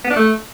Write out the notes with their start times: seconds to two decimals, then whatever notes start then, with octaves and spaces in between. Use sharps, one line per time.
0.05 B3
0.11 D4
0.17 A3